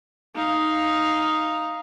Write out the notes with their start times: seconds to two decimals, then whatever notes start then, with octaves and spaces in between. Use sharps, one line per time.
0.36 D#4 F5